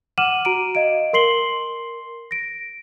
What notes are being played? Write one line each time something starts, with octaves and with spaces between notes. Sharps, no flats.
F#5 D6 F6 D#7 E7 F#7
F#4 A#5 D7 D#7
D#5 F5 D7
A#4 C6 C7 F#7 G7
A#6 D7